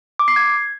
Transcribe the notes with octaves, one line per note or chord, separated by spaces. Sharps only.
D6
C7
G#6